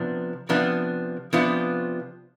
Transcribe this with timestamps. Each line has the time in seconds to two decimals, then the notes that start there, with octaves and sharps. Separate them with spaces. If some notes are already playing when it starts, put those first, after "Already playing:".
Already playing: C3 F3 B3 D4
0.49 C3 F3 B3 D4
1.33 C3 F3 B3 D4 F4